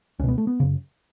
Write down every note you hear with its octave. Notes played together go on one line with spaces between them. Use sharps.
C#2 B2 B3 C#4
A3
B3
F#2 C#3